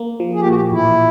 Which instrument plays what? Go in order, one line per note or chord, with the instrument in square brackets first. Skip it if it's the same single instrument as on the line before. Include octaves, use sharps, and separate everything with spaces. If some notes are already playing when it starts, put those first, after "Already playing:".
Already playing: [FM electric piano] A#3
F3
[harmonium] G#4
G4
[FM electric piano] A#2 [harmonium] F#4
[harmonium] G4
[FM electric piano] A1 [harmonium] E4